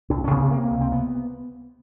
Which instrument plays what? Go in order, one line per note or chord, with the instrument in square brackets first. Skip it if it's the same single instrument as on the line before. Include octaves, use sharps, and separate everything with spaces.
[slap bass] C2 D4
C#4
C3 B3
C4
C3 A#3
C#2
C4
B3